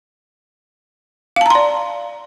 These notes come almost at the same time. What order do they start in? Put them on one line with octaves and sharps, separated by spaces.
F5 A5 A#5 C6 D5